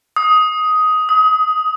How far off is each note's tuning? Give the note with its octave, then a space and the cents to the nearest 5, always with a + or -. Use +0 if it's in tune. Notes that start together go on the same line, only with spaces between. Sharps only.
D#6 +10
D#6 +30